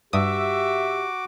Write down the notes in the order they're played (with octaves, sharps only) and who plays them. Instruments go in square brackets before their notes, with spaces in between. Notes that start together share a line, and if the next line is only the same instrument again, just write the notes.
[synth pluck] G2 D#6 [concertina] F#4 D6 [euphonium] G4 [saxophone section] E5